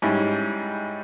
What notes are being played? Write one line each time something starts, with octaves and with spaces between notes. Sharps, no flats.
G#2 G3 C#4 E4